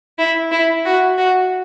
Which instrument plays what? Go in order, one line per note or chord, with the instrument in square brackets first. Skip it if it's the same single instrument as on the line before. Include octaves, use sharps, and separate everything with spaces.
[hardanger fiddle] E4
E4
F#4
F#4